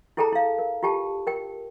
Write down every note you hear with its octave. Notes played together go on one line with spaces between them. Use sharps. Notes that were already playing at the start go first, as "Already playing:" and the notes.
E4 G#4 A4 G5 A5 A#5
E4 F5
A#4
F4 G4 G5 A5
A#4 G5